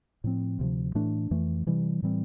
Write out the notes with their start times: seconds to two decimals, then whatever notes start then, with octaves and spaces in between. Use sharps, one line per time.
0.24 A2 F3 C4
0.59 D2 C3 F3
0.95 A2 E3 A3 D4
1.31 F2 E3 A3
1.67 C3 E3 G3
2.02 A2 E3 G3 C4